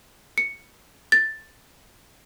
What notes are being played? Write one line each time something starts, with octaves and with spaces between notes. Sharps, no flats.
C#7
A6